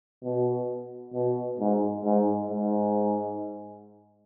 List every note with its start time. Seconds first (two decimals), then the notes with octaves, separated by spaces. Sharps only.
0.24 B2
1.14 B2
1.60 G#2
2.05 G#2
2.50 G#2